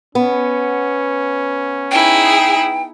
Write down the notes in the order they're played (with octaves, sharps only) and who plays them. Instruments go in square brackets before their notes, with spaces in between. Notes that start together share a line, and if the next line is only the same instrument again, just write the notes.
[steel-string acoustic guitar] B3 [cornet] C#4
[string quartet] D#4 E4 G#4 [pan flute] G5